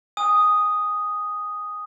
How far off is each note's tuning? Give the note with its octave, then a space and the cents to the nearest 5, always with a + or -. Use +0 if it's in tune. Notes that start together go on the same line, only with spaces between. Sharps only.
G#5 -25 D#6 +0